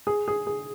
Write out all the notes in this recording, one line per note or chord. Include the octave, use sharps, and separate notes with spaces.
G#4
G#4
G#4